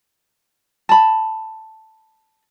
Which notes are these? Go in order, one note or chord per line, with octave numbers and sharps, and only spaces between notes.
A5 B5